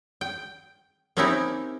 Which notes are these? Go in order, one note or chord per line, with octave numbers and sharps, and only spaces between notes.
G5
A#3 C4 C#4 D#4 E4 G4